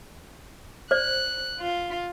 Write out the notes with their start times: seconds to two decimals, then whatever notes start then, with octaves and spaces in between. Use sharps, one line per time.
0.91 C5 D5 F#6
1.60 F4